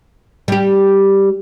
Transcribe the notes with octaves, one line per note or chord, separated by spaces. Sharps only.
G3 G4